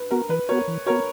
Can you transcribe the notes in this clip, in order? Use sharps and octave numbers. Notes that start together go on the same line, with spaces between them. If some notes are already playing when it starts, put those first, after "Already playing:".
Already playing: B4
B3 F#4 A#4
E3 B4
B3 F#4 A#4 C#5
E3
B3 F#4 A#4 C#5